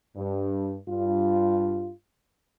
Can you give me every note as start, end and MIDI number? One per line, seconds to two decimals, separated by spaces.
0.16 0.76 43
0.88 1.90 43
0.88 1.90 65